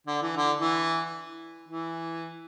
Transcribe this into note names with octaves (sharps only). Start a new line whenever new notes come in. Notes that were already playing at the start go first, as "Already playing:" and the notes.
D3
E3
D3
E3
E3